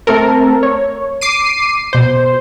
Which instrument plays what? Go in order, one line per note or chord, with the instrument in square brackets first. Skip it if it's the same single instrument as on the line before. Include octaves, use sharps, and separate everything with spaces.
[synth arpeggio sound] A3 C4 A4 A#4
C#5
D6 C7 D#7
B2 C5